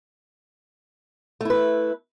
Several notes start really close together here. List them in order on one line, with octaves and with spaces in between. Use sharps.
A3 E4 B4